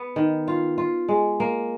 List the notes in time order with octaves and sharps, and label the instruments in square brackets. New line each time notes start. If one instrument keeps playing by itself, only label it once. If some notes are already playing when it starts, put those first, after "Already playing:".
Already playing: [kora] B3
D#3
F4
F4
G#3
A#3